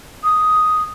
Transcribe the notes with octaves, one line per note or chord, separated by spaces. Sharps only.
D#6